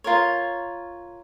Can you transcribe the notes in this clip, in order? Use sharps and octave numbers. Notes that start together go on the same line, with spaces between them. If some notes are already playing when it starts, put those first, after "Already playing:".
F4 A#4 C#5